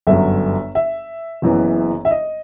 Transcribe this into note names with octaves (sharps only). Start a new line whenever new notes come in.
G1 F#2 F#3 E5
E5
F#1 F#2 E3 B3
E5
D#5